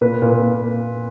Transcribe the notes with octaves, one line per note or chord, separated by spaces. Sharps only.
A#2 B4
A#2
B4
A#2